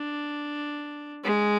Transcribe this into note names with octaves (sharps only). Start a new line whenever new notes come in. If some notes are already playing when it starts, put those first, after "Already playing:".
Already playing: D4
G#3